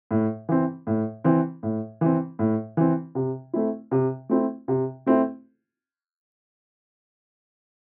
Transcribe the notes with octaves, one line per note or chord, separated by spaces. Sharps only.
A2
E3 C4
A2
E3 C4
A2
E3 C4
A2
E3 C4
C3
A3 C4 E4
C3
A3 C4 E4
C3
A3 C4 E4